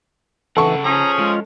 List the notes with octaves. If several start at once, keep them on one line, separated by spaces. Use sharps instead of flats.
C#3 E3 A4 F#5 C#6
F3 C#4 G#4 A#5
G#3 F4